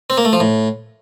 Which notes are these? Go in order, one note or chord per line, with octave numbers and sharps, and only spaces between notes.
C4
A#3
A3
F3
A2